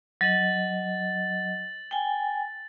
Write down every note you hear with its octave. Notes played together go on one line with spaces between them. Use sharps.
F#3 D#5 A6 F#7
G5 G#5